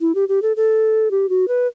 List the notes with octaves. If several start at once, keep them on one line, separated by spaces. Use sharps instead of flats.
E4
G4
G4
A4
A4
G4
F#4
B4